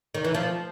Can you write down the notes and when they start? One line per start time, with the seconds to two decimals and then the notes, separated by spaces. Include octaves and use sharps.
0.14 D#3
0.24 E3
0.34 F3